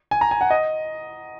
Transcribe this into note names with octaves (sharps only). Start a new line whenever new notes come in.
G#5
A#5
G#5
F#5
D#5